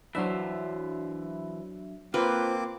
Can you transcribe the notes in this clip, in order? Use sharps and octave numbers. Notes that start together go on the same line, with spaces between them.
E3 F#3 D4 C5 E5
A#3 C4 F4 B4 C5 D6